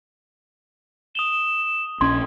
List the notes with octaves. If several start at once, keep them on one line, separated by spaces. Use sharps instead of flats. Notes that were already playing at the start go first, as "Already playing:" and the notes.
D#6 E7 F7 G7
A#1 C#4 C6 G#6